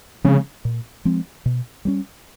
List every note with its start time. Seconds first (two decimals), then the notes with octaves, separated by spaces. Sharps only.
0.24 C#3 F3 G#3 C4
0.65 A#2
1.05 F3 G#3 C4
1.46 B2
1.85 G3 A#3 C#4